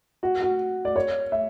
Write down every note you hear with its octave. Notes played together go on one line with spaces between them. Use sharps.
F#4
F#4
D5
C#5
E5